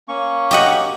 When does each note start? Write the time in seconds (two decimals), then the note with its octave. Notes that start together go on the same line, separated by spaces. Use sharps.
0.08 A#3 C#4 C#6
0.51 G4 D#5 F#5